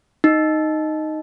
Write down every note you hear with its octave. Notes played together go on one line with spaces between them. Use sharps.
D#4